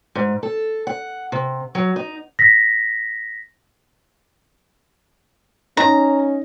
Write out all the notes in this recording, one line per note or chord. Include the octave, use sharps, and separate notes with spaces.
G#2
A4
F#5
C3
F#3
D#4
A#6 B6
C#4 D#4 A#5